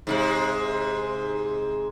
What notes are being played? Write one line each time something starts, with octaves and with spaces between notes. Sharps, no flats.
G#2 C3 G#3